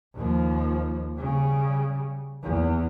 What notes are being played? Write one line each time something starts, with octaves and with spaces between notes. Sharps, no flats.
D#2 F3
C#3 G3
E2